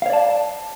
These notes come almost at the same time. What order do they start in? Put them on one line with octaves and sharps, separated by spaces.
F5 C#5 D5 A5